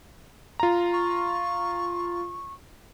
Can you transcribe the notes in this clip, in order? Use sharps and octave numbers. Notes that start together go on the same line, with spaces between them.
F4 A#5
C#6